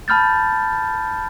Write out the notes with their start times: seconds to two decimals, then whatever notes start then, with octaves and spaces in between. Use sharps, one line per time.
0.08 A5 B5 F6 G6 A6